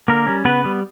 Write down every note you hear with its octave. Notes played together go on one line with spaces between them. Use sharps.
D3 A#3 A#4
G3 C#4
C#3 B3 B4
G3 B3